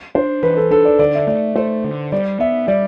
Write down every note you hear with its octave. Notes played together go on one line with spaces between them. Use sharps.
D4 C5
E3 B4
A4
D4 A4
D5
D3 D5
E5
A3 D5
A3 C5
D3
G3 D5
B3 E5
G3 D5